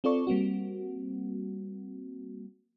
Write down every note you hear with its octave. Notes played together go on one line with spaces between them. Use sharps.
C4 F4 A4 D5 C#6
G3 A#3 C4 F#4